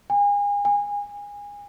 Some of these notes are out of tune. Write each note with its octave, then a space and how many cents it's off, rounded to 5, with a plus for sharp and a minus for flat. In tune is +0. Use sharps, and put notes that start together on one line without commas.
G#5 -35
G#5 -25